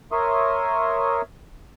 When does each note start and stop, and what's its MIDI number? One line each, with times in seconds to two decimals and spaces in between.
0.12 1.22 70
0.12 1.22 73
0.12 1.22 76
0.12 1.22 84
0.12 1.22 87